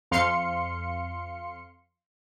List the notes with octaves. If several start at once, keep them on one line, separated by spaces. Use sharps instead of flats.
F2 F5 C6 C#7